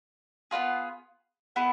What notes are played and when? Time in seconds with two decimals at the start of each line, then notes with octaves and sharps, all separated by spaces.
0.51 B3 D4 F4 G#4
1.56 B3 E4 G#4